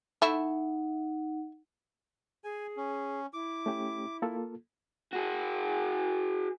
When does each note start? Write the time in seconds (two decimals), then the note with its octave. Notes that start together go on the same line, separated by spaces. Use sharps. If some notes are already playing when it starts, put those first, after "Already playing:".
0.22 A3 D#4 E4 F#5
2.44 G#4 G#5
2.77 C#4
3.33 E4 D6
3.66 A3 C#4 G4
4.22 A#3 F4 A4
5.13 F#4 G#4